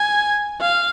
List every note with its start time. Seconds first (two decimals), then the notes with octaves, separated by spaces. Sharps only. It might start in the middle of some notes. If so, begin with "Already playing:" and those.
Already playing: G#5
0.61 F5